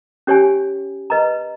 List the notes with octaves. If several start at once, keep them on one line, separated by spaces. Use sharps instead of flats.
C#4 G4 C#5 G#5
B4 D#5 A#5